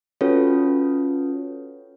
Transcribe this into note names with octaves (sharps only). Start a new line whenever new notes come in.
C#4 F4 F#4 A4 B4 C#5